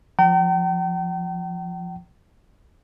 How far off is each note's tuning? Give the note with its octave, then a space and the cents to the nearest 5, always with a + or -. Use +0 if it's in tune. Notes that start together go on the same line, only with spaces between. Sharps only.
F3 +0 G5 -40 A#5 -40